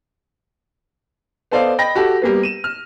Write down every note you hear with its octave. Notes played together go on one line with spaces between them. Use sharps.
B3 A4 C5 D5 D#5 F5
D#5 G5 B5 A#6
F#4 G4 A4
G3 A#3 B3
D#7 E7
F6